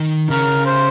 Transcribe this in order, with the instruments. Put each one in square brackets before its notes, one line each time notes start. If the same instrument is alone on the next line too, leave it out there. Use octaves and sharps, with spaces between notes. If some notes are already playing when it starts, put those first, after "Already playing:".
Already playing: [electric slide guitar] D#3 D#4
[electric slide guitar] C#3 C#4 [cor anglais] A#4
[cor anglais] C5